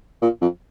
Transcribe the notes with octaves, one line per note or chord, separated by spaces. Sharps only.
A#2
F2